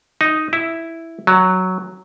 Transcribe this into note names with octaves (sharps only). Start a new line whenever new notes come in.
D#4
E4
F#3